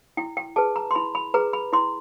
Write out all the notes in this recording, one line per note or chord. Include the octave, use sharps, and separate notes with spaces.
E4 G5
G5
G#4 B4 A5
A#5
C6
E4 B5
B5
G#4 B4 A#5
B5
E4 C6